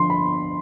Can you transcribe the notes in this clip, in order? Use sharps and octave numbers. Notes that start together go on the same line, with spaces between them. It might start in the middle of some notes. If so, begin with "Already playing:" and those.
Already playing: D3 F3 C6
B5